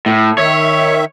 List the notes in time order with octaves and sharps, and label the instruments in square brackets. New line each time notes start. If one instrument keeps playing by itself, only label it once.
[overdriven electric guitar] A2
[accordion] D#3 E5 [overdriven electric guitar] C#5